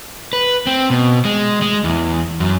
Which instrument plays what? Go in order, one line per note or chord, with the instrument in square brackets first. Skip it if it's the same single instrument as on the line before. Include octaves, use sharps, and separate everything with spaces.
[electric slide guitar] B4
C4
B2
G#3
G#3
E2
F#2